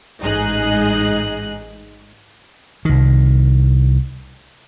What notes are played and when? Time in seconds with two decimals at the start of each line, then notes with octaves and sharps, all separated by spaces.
0.21 A1 G#2 D#4 G#4 D#5 F#6
2.85 C2 D#3